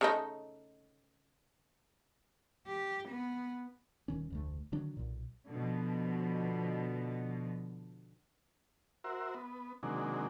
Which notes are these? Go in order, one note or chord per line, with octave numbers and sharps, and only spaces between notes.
C#3 A3 D#4
G4
B3
D#1 D#3 C#4
F1 D2 A3
D3 D#3 F#3 D4
B1 A#2
B2 D3 F3
F#4 A#4 C5 E5
B3
C3 D#3 F#3 G#3 A#3 D4